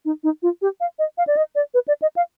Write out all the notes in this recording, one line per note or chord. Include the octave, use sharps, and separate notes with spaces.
D#4
D#4
F4
G4
F5
D#5
F5
D5
D#5
D5
B4
D5
D#5
F5